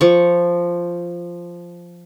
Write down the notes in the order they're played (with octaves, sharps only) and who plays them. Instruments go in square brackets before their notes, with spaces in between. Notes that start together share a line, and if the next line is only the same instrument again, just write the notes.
[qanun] F3 C#6